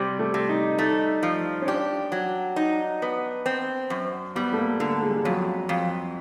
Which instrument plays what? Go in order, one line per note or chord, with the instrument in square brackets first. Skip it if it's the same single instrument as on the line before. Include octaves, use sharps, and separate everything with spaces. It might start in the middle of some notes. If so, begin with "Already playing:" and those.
Already playing: [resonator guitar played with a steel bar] C3 [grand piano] G3
[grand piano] A3
[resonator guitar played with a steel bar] C3
[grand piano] D#4
[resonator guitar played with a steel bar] A3 [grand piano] D#4
[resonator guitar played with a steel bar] F3
[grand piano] C#4
[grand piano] D4 [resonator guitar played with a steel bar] G4
[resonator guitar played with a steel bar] F#3
D#4
B3
C4
F#2
[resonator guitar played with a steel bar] G3 [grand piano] B3
[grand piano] A3
A#3
[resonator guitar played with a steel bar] D3 [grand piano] A3
[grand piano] G#3
G3
G#3
[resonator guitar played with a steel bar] F2 [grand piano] F#3
[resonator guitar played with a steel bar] F2